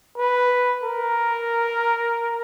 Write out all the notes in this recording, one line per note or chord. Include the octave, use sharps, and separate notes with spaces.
B4
A#4